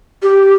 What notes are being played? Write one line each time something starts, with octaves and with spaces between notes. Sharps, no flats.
G4